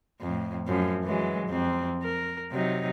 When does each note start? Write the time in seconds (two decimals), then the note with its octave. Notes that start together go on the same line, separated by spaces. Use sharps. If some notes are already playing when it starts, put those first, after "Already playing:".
0.21 F2 A2
0.68 F#2 F3
1.04 E3 F#3 G#3
1.48 F2 C4
2.03 A#4
2.52 C3 F#3 D#4